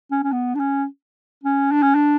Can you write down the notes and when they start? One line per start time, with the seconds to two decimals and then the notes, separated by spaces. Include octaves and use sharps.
0.11 C#4
0.23 C#4
0.32 B3
0.55 D4
0.60 C#4
1.44 C#4
1.72 D4
1.82 C#4
1.95 D4